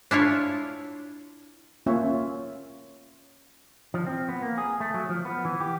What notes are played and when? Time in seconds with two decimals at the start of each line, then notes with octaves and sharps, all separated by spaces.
0.11 D4 E4 F4 C#5
1.86 A#3 C#4 F4 C#5 E5
3.94 F3
4.07 C4
4.29 B3
4.42 A#3
4.58 G#4
4.80 A3
4.94 F#3
5.09 F3
5.25 B3
5.45 E3
5.60 G4